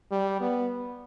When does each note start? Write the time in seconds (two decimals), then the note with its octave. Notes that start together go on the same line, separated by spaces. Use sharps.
0.11 G3
0.40 B3